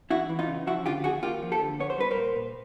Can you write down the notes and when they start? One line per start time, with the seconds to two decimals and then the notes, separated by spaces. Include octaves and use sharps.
0.10 E2 E4 F#4
0.29 E3
0.39 D#4 F4
0.48 C#3
0.67 F3 E4 F#4
0.85 D3 F4 G4
1.04 D#2 F#4 G#4
1.23 A#3 F4 G4
1.43 F3
1.52 G4 A4
1.61 D3
1.80 B3 C#5
1.90 C5
1.98 G3 B4
2.11 A#4 C5
2.17 A#2
2.36 A#2